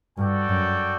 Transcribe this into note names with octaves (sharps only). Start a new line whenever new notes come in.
G2 F#4 A4 D5 G5
F#2